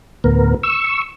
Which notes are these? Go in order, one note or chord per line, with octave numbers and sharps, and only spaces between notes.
D2 A2 B3 A#4
C#6 E6